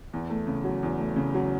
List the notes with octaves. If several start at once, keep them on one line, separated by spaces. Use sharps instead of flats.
E2
A3
C#3
F#3
E2
A3
C#3
F#3